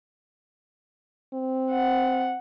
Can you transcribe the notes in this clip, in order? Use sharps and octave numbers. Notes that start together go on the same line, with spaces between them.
C4
F#5